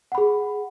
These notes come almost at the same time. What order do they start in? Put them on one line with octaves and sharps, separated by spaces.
F#5 B5 G#4